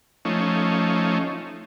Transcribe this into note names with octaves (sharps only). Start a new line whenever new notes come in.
F3 A3 C#4 D#4